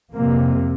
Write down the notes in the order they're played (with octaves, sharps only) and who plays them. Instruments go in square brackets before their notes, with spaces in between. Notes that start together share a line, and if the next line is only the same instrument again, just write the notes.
[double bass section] F2 C3 A#3